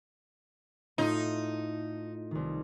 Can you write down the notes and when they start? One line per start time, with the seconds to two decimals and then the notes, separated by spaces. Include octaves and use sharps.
0.98 A2 A3 D#4 F4
2.31 C2 D#3